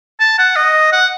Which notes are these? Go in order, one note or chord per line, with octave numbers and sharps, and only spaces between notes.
A5
F#5
D#5
F#5